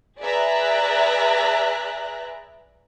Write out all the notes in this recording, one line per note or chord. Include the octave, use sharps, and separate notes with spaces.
G#4 B4 D5 E5 A#5 F#6